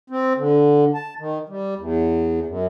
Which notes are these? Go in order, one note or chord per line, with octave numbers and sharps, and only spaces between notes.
C4
D3
A5
D#3
G3
E2
F#2